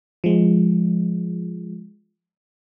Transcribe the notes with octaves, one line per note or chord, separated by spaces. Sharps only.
F3 G#3